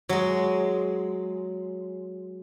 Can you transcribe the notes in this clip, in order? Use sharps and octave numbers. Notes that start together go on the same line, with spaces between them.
F#3 G#3